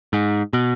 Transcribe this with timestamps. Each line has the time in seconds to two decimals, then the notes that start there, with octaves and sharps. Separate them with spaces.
0.13 G#2
0.53 B2